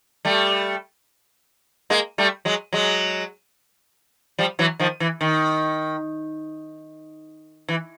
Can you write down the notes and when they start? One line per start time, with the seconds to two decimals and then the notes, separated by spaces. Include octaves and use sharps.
0.25 G3 A3
1.90 G#3 A#3
2.18 G3 A3
2.45 F#3 G#3
2.73 F#3 G#3
4.39 F3 G3
4.59 E3 F#3
4.79 D#3 F3
5.00 E3
5.21 D#3
7.68 E3